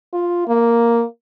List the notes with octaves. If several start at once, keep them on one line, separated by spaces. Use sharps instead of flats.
F4
A#3